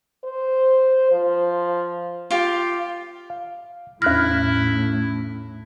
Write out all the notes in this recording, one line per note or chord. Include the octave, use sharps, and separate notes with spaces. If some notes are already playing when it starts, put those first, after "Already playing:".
C5
F3
F4 G4
F5
E2 A2 C#4 E4 F6 F#6 A#6